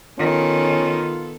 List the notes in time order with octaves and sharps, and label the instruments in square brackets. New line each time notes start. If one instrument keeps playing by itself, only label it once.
[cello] D#3 [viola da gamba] B3 A4 [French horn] C#4 [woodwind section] F4